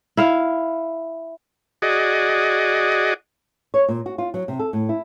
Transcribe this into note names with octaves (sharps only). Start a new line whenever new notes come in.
E4 F5
F#4 G#4 D5 D#5
C#5
A#2
F#4
F4
F#3
C3
A4
A2
E4